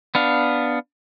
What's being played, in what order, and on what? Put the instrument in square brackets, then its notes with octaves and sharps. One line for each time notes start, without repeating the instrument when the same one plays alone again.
[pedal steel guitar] B3 D4 F5